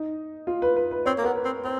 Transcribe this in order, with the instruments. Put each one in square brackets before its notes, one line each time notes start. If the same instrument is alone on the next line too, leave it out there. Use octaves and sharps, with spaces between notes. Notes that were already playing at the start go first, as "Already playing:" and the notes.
Already playing: [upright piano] D#4
F4
B4
B4
B4
[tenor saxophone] C4 [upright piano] C#5
[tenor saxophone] A#3
[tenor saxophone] B3 [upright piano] A#4
[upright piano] B4
[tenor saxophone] C4
[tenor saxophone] C4 [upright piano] C5